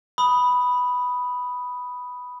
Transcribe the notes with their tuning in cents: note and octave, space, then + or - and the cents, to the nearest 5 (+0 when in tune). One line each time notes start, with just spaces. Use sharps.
B5 +0 D#6 +0